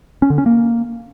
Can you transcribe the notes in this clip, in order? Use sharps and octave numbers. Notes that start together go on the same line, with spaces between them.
C#4
D3
C#4
A#3